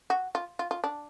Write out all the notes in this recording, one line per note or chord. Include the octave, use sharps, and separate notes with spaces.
F#4
F4
F4
F4
D4